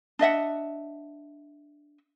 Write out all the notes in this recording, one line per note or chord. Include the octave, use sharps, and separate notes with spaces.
D4 D#5 E5 F#5